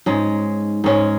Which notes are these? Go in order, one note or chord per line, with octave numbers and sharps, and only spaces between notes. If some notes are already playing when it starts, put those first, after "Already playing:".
G#2 G#3 C#4
G#2 G#3 C#4